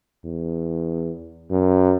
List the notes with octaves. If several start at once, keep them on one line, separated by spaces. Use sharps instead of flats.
E2
F#2